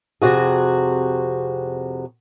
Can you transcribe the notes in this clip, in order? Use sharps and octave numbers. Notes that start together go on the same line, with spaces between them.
F2 C3 F#4 G#4